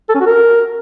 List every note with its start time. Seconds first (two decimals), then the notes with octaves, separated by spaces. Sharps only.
0.09 A4
0.15 C#4
0.20 F#4
0.26 A#4